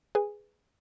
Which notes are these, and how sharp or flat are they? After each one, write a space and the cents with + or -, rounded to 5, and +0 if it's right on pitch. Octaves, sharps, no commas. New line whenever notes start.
G#4 +0 B4 +10 G#5 -15